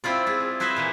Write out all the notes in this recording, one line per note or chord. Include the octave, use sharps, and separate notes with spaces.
C4 E4 F4 D5
E4 F4 G#4
E4 B4 C5 D#5 E5 G#5
A#2 E3 A#3